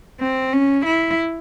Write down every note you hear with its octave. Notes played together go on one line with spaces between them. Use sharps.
C4
C#4
E4